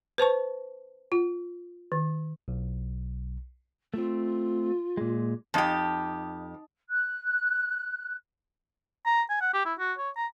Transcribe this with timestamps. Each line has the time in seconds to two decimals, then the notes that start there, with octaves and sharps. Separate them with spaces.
0.18 B4 C5 A5 C#6
1.12 F4
1.92 D#3
2.48 B1
3.94 A3 C4 F4
4.97 A#2 G#3
5.54 F2 D#4 G4 A5
6.90 F#6
9.06 A#5
9.30 G#5
9.41 F#5
9.54 G4
9.65 E4
9.79 F#4
9.98 C#5
10.16 A#5